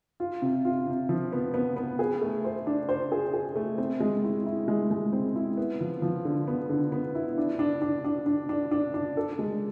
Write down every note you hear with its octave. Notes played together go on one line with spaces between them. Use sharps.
F4
C3
F4
C3
F3
B3
B3
B3
G#4
A3
C5
D4
C5
G#4
G#4
A3
C4
G#3
E4
E4
G#3
G#3
C4
E4
B3
F3
F3
D3
B3
D3
B3
E4
D4
D4
D4
D4
D4
D4
D4
D4
A4
G#3